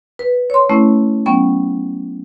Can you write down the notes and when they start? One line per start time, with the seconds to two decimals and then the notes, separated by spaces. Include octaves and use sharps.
0.19 B4
0.50 C#5 C6
0.70 A3 C#4 E4
1.26 F#3 B3 C#4 G5